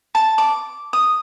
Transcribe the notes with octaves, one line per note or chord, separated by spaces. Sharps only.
A5
D6
D#6